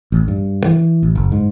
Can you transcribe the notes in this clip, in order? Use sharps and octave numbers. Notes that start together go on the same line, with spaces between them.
A1
G2
E3
A1
F#1
G#2